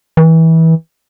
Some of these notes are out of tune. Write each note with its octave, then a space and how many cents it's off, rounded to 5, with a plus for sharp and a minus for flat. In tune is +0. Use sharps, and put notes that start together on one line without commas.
E3 -25